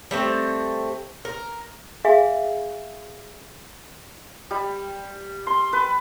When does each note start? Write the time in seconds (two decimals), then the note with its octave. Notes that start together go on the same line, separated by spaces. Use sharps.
0.11 G3 A3 C4
1.25 A#4
2.05 G#4 E5 F5 G#5
4.51 G3
5.47 C6
5.73 B4